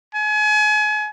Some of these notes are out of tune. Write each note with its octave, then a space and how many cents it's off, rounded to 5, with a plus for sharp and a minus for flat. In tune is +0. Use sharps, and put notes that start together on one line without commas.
G#5 +35